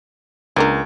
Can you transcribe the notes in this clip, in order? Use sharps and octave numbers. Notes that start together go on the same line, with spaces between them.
C#2 A#3 D4 A#4